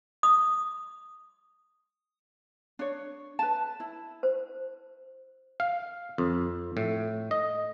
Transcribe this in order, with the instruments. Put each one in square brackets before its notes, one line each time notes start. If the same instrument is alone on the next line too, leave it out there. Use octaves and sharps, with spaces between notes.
[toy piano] D#6
[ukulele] D4 C#5
B4 A5
E4
[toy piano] C5
[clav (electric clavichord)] F5
F2
A2
D#5